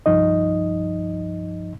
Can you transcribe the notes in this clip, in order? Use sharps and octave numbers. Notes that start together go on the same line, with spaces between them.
C2 G2 F3 D#4 D#5